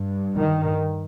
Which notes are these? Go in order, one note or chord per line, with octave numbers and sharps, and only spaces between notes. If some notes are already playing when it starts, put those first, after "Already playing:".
Already playing: G2
D#3